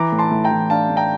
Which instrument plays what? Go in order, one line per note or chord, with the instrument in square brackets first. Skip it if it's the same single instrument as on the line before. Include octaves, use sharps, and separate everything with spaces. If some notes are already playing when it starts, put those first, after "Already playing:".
Already playing: [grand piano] E3 A#5 D6
A2
A5 C6
A2
G5 A#5
E3
D4 F5 A5
A2
G5 A#5